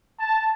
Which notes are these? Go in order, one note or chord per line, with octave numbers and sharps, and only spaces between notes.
A5